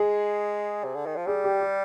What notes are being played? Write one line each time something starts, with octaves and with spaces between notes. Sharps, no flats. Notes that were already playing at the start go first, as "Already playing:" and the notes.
Already playing: G#3 G#4
C3
D3
D#3
F3
G3 G#4
G4
G4